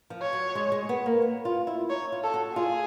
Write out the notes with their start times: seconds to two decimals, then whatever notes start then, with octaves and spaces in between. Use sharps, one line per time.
0.10 F3
0.22 C#5
0.33 F#3
0.55 G#3
0.72 G#3
0.89 B3
1.06 A#3
1.22 B3
1.45 F4
1.67 E4
1.90 D#4 C#5
2.12 F4
2.23 A4
2.34 F#4
2.56 F4 G#4